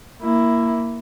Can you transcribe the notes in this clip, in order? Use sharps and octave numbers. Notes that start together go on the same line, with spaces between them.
A#3 E4